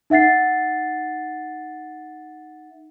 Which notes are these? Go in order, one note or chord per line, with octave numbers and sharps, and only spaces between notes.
D#4 E5 F#5 A6 C7